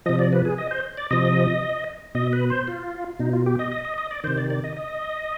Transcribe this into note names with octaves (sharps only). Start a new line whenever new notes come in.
C3 F3 D#5
D5
B4
G#4
D#5
C5
D5
C3 F3 D#5
B2 D#5
B4
C5
F4
B2 D#4
F4
G4
D#5
D#5
D#5
D#5
D5
C3 D#3 C5
D5
D5
D#5
D#5